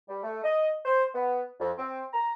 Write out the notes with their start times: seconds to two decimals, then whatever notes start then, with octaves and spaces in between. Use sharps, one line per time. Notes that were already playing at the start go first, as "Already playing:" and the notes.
0.09 G3
0.23 A3
0.44 D#5
0.85 C5
1.14 B3
1.60 F2
1.78 C4
2.13 A#5